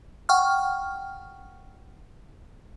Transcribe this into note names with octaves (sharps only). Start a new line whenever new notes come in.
F#5 G5 C#6 F6